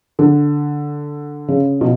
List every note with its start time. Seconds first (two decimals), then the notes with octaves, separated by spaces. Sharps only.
0.19 D3
1.48 C#3
1.81 B2